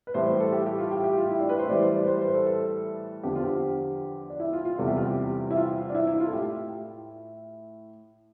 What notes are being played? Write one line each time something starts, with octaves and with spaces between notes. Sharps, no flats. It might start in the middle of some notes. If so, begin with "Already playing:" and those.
B4
A2 E3 G3 C5
G4
A4
G4
G4
F4
G4
G4
F4
E4
D4
B4
C5
A2 E3 G3 D5
C5
D5
B4
C5
C5
B4
A4
A4
E2 D3 F3 G4
F4
G4
D4
E4
F4
F4
E2 C3 E3 G3 A4
G4
F4
G4
E4
F4
D4
E4
E4
F4
A4
A2 G4